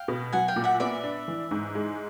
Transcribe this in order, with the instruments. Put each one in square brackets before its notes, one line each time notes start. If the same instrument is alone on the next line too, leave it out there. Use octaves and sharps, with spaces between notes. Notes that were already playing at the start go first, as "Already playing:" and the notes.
Already playing: [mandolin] F5 G5
[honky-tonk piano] B2
[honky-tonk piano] F#3 [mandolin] F#5 G#5
[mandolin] F5 G5
[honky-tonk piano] A#2
[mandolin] E5 F#5
[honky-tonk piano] B3 [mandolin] D5 E5
[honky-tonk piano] D4
E3
G#2
G#3